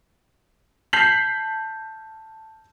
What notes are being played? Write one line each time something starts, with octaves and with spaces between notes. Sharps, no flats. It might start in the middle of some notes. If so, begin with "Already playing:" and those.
A5 G6 B6 C7 F7 F#7